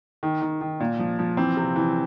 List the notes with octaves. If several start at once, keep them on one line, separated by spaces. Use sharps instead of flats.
D#3
D#3
D#3
A#2
F3
F3
E3 C4
C3
E3